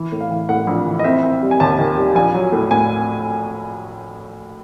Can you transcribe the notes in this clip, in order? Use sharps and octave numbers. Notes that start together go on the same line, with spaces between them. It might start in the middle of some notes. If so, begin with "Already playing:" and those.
Already playing: E3
A2
F5
E3
A2 F#5
A#1
E3
D#5
C4 E5
C4
G3
G#5
D#2 A5
D#3
G3
A#1 G#5
F#3
A2
A2 G#5